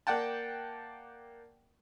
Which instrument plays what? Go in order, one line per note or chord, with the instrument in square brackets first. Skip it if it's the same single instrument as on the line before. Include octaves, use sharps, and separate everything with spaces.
[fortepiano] A#3 D5 F#5 G5 A5